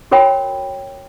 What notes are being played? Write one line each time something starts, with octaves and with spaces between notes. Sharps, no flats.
F#4 A#4 C#5 G5 B5